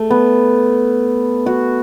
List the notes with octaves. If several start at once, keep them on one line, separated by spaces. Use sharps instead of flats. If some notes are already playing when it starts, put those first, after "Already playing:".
Already playing: A3
B3
F#4